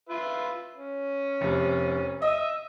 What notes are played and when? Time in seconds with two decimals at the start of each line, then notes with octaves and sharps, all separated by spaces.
0.09 F4 B4 E5
0.76 C#4
1.41 F1 C3
2.22 D#5 E5 D#6 E6